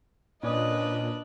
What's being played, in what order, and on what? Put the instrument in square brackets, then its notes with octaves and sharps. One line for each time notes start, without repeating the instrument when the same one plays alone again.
[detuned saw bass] A#2 [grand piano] C#4 D5 D#6 [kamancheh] D4 B4 [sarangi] D#5